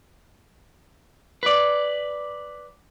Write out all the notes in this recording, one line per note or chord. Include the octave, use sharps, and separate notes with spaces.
B4 D5